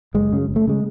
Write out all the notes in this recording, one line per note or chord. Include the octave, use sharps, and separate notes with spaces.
F#1 G#3
F#2 C#3
F#1
A3
C#3 G#3